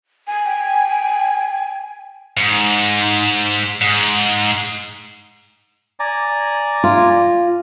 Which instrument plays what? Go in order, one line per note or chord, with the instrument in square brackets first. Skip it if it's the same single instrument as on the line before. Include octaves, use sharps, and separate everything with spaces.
[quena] G#5
[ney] G5
[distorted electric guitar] G#2
G#2
[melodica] D5 G#5 A#5
[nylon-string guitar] F4